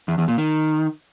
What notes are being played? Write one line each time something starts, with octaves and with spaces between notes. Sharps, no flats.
E2
E2
A#2
D#3